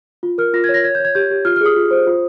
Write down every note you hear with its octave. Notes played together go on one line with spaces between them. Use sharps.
F4
A#4 F6
F4 A#6
G#6
C#5
A#6
C#5 G#6
G6
C#5 G#6
G4 G6
G4
F4 F6
F6
G#4 D#6
F4
C5
F4